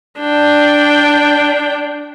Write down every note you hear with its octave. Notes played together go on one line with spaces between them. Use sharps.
D4 G5